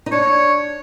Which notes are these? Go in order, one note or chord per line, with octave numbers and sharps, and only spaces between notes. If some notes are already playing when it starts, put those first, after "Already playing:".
D#4
D4 C#5